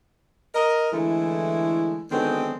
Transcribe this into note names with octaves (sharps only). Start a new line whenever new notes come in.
A#4 D#5
D3 E3 G#3 A3 E4
D3 D#3 F#3 G#3 B3 C4